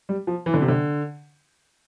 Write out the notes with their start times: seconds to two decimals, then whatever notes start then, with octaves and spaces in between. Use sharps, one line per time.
0.09 G3
0.27 F3
0.46 E3
0.54 D3
0.61 C3
0.68 D3